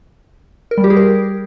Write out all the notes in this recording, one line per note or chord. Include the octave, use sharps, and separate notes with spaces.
A#4
G3
G4
G#4
A#4